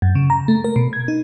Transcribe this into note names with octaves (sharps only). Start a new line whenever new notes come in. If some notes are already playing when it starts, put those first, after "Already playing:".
F#2
C#3
A#5
A3
A#4
B2
G#6
D#4